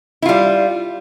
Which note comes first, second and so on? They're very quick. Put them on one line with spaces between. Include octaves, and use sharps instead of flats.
E4 F4 G3